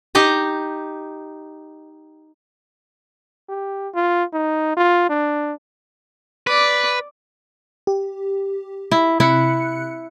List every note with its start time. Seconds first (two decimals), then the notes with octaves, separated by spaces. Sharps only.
0.15 D#4 G4 D#5
3.49 G4
3.94 F4
4.33 D#4
4.77 F4
5.09 D4
6.47 B4 D5 D6
7.87 G4
8.91 E4
9.20 C3 E4 F#6 C#7